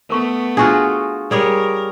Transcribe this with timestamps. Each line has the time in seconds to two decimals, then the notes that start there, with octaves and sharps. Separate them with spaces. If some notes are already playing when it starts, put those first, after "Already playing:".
0.10 A3 B3 A#4 C#6
0.57 D4 F4 F#4 G#4 G#5 C#6
1.31 G3 G#4 A#4 C#5